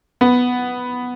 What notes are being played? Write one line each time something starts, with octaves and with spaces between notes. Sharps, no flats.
B3